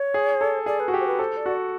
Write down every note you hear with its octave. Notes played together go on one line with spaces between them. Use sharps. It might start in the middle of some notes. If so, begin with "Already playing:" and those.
Already playing: C#5
G#4
A4
G#4 D5
B4
F#4
G4
C5
B4
A4 C5
D5
F#4